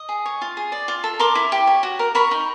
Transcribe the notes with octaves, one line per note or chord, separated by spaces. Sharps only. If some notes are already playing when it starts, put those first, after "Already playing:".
Already playing: D#5
G#4
C#5
F4
G#4
D5
F4
A4
A#4 C6 D6
E4
G4
C#5
F#4
A#4
A#4 B5 C#6
D#4